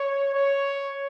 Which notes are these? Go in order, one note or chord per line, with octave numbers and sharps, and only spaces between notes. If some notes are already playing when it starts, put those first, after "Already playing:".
Already playing: C#5
C#5